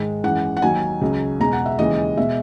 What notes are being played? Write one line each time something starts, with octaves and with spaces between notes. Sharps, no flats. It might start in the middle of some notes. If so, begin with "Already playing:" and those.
Already playing: G#2 D#3 G#3
F#2 E3 G#3 F#5
F#5
D#2 D#3 F#3 G#5
C#2 C#3 F#3
E2 B2 G#3 A#5
F#5
E5
D#2 C#3 E3 G#3 D#5
B2 G#3 E5